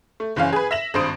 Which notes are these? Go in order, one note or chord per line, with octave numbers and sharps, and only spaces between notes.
A3
F#1 E3 C#4 F5
G#4 B4
E5 A#6 E7 F#7
G#1 G2 C5 D#6 D7